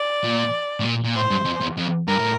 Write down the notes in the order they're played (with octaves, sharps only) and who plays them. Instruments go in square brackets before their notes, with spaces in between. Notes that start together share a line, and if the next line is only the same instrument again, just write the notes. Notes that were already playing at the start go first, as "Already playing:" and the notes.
Already playing: [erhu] D5
[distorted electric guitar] A#2
A2
A#2
A#2
[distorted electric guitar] A2 [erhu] C5
[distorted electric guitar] G2
F2
E2
F2
[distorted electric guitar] G2 [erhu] A#4
[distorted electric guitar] A2